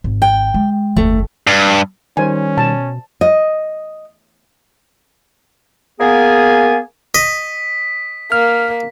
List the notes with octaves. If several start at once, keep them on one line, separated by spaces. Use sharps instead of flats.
G#1
G5
G#3
F#1 D#2 A3
G2
D#3 G3 C#4 D#4 C5 G#5
B2 A5
D#5
A#3 B3 G#4 G#5
D#5 B6
A#3 F6